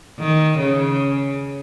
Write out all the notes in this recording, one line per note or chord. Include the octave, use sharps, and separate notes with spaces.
D#3
C#3